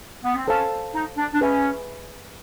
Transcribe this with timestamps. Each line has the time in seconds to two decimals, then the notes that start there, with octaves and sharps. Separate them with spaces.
0.24 B3
0.35 C4
0.47 C#4 A4 C5 F5 A5
0.94 D#4
1.18 D4
1.33 D4
1.41 C#4 G#4 B4 E5 G#5 B5